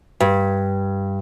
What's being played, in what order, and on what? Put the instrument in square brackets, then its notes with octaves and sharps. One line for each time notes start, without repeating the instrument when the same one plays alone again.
[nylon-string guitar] G2